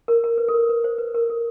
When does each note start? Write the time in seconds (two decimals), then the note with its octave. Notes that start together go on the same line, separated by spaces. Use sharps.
0.08 A#4
0.24 A#4
0.38 B4
0.48 A4
0.54 A#4
0.69 B4
0.84 C5
0.98 B4
1.15 A#4
1.30 A4